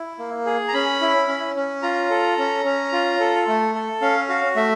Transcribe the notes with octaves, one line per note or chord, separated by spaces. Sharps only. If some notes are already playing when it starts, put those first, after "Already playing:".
Already playing: E4
A#3
G#4
A#5
C#4 B5
E4
C#4
C#4
F4 A#5
A4
C#4
C#4
F4
A4
A3
A4
C#4 F5
F#4 F5
A3 E5